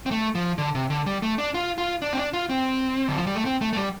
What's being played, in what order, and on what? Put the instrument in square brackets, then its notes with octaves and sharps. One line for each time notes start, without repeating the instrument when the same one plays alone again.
[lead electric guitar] C4
A3
F3
D3
C3
D3
G3
A3
D4
F4
F4
D4
C4
D4
F4
C4
D3
F3
G3
A3
C4
A3
A3
G3